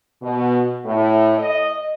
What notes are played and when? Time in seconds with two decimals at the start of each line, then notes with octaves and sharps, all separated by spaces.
0.22 B2
0.86 A2
1.38 D#5